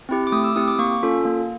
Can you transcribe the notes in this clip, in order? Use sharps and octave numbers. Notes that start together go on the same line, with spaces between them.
C4 E4 G4
D6
A3 D#6
E6
C4 E4 G4 D#6
D6
A#3 C#6
C#4 F4 A4
A#3